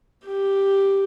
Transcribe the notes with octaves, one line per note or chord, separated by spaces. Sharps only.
G4